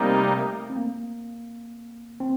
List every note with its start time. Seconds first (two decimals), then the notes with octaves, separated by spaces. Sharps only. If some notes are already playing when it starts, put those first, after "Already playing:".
Already playing: C3 G3 A3 A#3 D#4
0.70 C4
0.76 A#3
2.20 C4